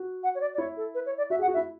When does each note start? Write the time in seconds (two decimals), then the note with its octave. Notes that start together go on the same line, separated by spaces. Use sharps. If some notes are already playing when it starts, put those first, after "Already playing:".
Already playing: F#4
0.23 F#5
0.35 C#5
0.41 D5
0.54 D5
0.58 E4 C#5
0.77 A4
0.94 B4
1.06 C#5
1.18 D5
1.30 F#4 E5
1.39 G#4 F#5
1.48 F#4
1.54 E5
1.57 E4